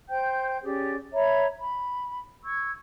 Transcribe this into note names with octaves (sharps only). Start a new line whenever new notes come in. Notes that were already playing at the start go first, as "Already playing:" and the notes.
C5 G5 G6
C#4 G4 G#4 D5
C#5 E5 A#5 B5
B5
C#6 E6 G#6